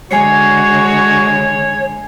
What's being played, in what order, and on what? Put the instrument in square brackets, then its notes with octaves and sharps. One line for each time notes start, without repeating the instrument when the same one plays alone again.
[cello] D3 G#3 [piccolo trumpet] F#4 [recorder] C#5 [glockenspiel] G#5 C7 C#7